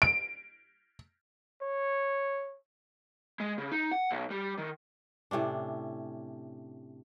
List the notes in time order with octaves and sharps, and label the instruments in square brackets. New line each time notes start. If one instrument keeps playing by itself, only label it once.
[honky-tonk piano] D7
[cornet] C#5
[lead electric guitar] G#3
C#3
D#4
F#5
B1
G3
D#3
[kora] A2 C3 C#4 D4